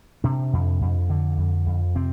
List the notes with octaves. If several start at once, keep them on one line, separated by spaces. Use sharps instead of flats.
C3 D4
F2
F2
D3
F2
F2
C3 C4